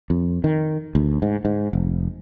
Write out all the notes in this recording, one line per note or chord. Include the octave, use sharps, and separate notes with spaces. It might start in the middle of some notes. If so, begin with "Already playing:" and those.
F2
D#3
D2
G#2
G#2
F1